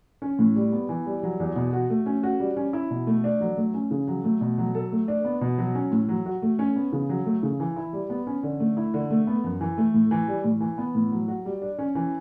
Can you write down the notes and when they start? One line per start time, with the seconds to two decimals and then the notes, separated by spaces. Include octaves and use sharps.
0.22 C#4
0.39 A2
0.56 G3
0.72 B3
0.89 E3
1.06 G3
1.23 F#3
1.40 E2
1.56 B2
1.73 F#4
1.90 A3
2.06 C#4
2.23 F#4
2.40 G3
2.57 C#4
2.73 E4
2.91 B2
3.07 A3
3.24 D4
3.40 F#3
3.57 A3
3.74 C#4
3.91 C#3
4.07 F#3
4.24 A3
4.41 B2
4.58 F#3
4.75 A4
4.92 A3
5.08 D4
5.25 B3
5.41 B2
5.58 F#3
5.75 C#4
5.92 A2
6.09 F#3
6.26 F#4
6.42 A3
6.59 C#4
6.76 B3
6.93 C#3
7.09 F#3
7.26 A3
7.43 C#3
7.60 E3
7.76 E4
7.93 G3
8.10 B3
8.27 C#4
8.43 D3
8.60 A3
8.77 E4
8.94 D3
9.11 A3
9.27 B3
9.44 F#2
9.61 E3
9.78 A3
9.94 A2
10.11 E3
10.28 G3
10.44 A2
10.61 E3
10.78 B3
10.95 A2
11.12 F#3
11.28 F#4
11.45 G3
11.62 D4
11.79 C#4
11.95 E3